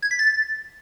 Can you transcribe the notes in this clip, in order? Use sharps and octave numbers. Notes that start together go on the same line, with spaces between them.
G#6
B6
A6